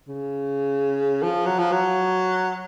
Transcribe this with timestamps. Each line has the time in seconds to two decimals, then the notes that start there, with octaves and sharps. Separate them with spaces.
0.08 C#3
1.23 F3
1.46 F#3
1.58 F3
1.72 F#3